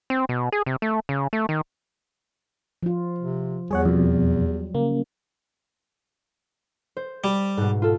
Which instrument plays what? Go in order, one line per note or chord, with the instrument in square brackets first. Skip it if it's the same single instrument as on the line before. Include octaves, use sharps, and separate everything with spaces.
[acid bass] C4
B2
G#4
C3
A3
C#3
A3
D#3
[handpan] F3 F4
[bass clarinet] C3
[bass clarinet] E2 [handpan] G3 [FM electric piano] G#4 C#5 F#5
[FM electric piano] F2 B2
[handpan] F#3
[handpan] C#3 [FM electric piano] A#3
[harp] C5
[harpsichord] G3
[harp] G#2 B2
F4 A4